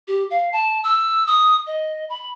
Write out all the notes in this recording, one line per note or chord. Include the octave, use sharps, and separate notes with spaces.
G4
F5
A5
E6
D#6
D#5
B5